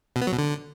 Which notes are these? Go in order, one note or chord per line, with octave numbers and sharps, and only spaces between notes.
B2
B3
F#3
B2
D3